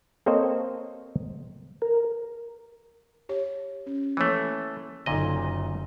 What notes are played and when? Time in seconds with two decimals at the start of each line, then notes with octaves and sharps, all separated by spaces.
0.26 A#3 C4 A4 C5 C#5 D#5
1.82 A#4
3.29 G4 C#5
3.86 C#4
4.17 E3 F3 A3 A#3 C#5
5.06 F#1 A#2 D3 D#4 A4 D#5